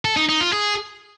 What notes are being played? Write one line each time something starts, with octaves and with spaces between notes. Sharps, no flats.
A4
D#4
D#4
F4
G#4